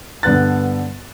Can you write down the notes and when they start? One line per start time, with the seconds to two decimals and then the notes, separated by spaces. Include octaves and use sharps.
0.23 G2 D3 B3 F#6 A6